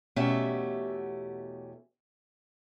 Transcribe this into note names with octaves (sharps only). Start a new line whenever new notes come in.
E2 B2 A3 C#4 G4 E5